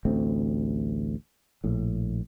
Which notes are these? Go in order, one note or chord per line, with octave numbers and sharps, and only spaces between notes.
A1 D2 A3 C4
A#1 A2